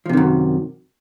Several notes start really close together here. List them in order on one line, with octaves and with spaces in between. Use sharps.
F3 C3 D#3 F#2